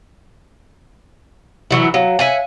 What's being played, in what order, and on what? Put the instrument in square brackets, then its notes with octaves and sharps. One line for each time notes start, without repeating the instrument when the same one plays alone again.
[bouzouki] E3 F#3 E4
[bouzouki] F#3 [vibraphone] C#5 F5
[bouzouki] E5 F#5 G#5